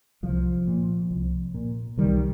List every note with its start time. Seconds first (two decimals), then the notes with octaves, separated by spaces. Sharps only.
0.23 C2 F3
0.67 A#2
1.10 C2
1.54 A#2
1.97 C2 D#3 G3